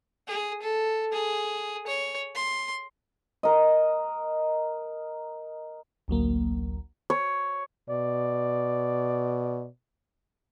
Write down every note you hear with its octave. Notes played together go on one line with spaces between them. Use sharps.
G#4
A4
G#4
C#5
C6
A#4 D#5
A1 D2 F#3 A#3
C#5
B2 D5